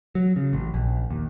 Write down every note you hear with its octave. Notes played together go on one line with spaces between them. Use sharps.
F#3
C#3
A1
A#1
D#2